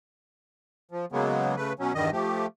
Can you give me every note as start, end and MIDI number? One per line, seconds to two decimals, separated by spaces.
0.92 1.05 53
1.12 1.56 49
1.12 1.56 54
1.12 1.56 56
1.12 1.56 58
1.12 1.56 59
1.57 1.73 49
1.57 1.73 57
1.57 1.73 71
1.79 1.93 47
1.79 1.93 54
1.79 1.93 61
1.95 2.10 40
1.95 2.10 43
1.95 2.10 51
1.95 2.10 55
1.95 2.10 75
2.12 2.46 53
2.12 2.46 57
2.12 2.46 67